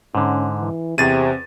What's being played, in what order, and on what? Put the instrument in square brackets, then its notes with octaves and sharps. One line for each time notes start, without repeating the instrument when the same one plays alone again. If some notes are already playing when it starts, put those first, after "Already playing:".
[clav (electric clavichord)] G#2 D3 [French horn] C#4
[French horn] E3
[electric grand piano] E2 A6 D#7 [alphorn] C3 [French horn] C4 [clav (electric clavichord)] G#4